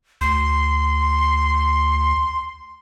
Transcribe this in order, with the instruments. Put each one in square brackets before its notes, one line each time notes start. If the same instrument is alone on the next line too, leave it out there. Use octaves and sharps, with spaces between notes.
[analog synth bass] D2 [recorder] C6